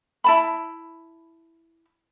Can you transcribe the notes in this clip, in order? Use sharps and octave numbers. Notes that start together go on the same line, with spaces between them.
E4 A5 B5